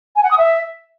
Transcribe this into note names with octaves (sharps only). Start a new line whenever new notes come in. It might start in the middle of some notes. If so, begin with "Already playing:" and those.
G#5
F#5
D#6
E5